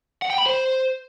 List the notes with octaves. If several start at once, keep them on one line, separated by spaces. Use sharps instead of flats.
F#5
G5
B5
C5